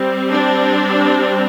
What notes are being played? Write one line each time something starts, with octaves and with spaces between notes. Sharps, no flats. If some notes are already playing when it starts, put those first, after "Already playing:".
Already playing: G3 C4
D4